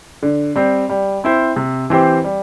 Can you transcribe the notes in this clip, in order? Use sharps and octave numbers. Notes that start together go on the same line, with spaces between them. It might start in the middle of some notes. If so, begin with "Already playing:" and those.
D3
G3 C4
G3
C4 E4 C5
C3
E3 C4 G4 C5
G3